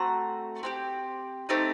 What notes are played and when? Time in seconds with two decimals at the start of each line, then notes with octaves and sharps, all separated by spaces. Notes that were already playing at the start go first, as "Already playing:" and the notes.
Already playing: A3 C4 F#4 A#5
0.63 C4 D#4 G4
1.49 A3 C4 D#4 G4